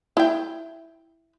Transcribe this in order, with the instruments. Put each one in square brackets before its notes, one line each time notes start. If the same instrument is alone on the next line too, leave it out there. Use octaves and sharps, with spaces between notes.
[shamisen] E4 G5